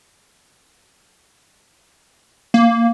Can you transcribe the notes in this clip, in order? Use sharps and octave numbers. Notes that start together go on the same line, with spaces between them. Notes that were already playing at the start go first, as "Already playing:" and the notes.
A#3